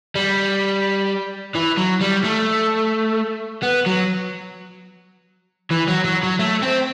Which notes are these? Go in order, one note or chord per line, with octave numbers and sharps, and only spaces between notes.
G3
E3
F#3
G3
A3
B3
F#3
E3
F#3
F#3
F#3
A3
C4